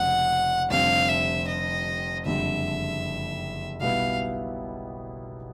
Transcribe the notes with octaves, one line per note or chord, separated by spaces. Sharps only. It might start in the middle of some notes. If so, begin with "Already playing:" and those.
Already playing: F1 F2 C#3 F3 G#3 F#5
F1 F2 D3 G3 C4 F5
E5
D#5
F#1 F2 D3 G3 E5
B1 B2 G3 B3 E4 F5